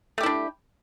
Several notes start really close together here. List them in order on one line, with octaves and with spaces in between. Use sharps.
A3 G4 E4 D4